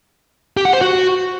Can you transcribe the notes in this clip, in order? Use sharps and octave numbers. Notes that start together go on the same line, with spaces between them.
G4
F#5
C5
F#4